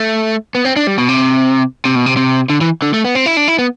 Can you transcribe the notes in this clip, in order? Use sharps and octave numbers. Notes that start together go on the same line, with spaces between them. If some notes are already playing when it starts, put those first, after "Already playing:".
Already playing: A3
B3
C4
D4
G3
B2
C3
C3
B2
C3
C3
D3
E3
D3
A3
B3
C4
E4
D4
E4
B3